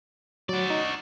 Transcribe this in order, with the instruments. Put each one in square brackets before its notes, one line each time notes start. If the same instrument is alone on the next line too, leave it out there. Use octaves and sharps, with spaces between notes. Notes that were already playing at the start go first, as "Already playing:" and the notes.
[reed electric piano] F#3 [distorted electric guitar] F#4 D5
[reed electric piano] D#4